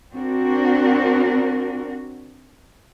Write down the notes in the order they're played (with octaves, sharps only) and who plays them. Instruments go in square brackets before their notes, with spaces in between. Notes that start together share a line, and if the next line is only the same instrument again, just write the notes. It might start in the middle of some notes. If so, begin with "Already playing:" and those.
[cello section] C4 D4 F#4 A#4